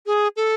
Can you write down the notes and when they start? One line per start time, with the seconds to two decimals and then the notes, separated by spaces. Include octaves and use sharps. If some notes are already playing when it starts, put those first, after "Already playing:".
0.06 G#4
0.36 A4